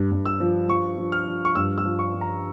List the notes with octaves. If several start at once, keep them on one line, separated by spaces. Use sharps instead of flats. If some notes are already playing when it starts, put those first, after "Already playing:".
Already playing: G2
G2
E6
F3
F3 C#6
F3
F6
F3
C#6
G2 E6
E6
F3
C#6
F3
A#5